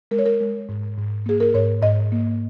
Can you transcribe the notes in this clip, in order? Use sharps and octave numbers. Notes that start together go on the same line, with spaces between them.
G#3 A#4
C#5
A#4
G#3
G#2
G#2
A#3 G#4
A#4
G#2 C#5
G#2 D#5
A#3